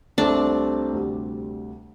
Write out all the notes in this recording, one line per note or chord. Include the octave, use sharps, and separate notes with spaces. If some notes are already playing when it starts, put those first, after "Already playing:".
C2 C3 A3 C4 D4 G4
D2 C3 G3